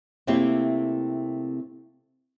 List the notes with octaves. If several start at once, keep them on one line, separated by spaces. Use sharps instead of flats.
C3 A3 A#3 C4 E4 G4